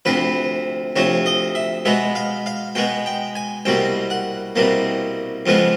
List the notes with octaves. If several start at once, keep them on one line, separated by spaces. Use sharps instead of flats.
D2 C3 F3 B4
D2 C3 F3 C#5
D#5
E5
B2 G#3 B3 E5
F5
F5
B2 G#3 B3 G5
G5
G#5
C2 B2 G3 A#3 G5
F#5
C2 B2 G3 A#3
F2 C#3 F3 G#3 B3